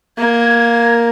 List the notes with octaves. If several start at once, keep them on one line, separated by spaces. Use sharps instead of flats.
A#3 G#6